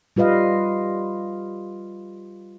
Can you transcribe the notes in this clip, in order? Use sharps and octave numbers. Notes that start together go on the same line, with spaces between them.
G3 F4 B4 D#5 F5